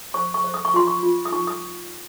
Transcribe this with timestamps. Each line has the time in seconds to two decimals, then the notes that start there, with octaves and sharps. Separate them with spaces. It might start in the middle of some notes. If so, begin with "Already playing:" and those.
0.14 C5 C#6
0.34 C#6
0.44 C5
0.54 D#6
0.65 C#6
0.74 F4 C6
0.87 C#6
1.03 F4
1.25 D#6
1.32 D#4 C#6
1.47 D#6